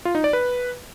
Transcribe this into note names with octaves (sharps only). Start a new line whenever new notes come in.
F4
D#4
D5
B4